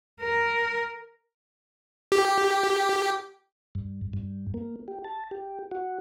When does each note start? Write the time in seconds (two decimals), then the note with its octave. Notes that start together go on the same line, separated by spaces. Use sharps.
0.21 A#4
2.12 G4
3.75 G2
4.13 G2
4.54 A#3
4.88 G4
5.04 A5
5.31 G4
5.71 F#4